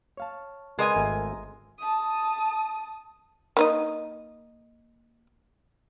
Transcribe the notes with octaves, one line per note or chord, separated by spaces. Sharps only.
C#5 F5 A5
G#3 A#4 B4 D#5 G#5
G#1 A3 A#4
A5 D#6
A#3 D#4 D#5